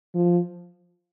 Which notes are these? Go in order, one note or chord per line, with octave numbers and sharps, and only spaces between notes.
F3